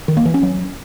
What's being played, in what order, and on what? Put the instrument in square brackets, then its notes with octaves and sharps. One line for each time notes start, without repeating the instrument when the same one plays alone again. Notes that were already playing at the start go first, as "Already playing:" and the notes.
[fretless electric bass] D#3
A#3
E3
C#4
F#3